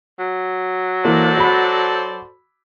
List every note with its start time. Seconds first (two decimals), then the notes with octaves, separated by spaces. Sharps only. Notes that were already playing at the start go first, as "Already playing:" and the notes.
0.19 F#3
1.05 E3 A#3 A4 C5 D5
1.37 F#4 B5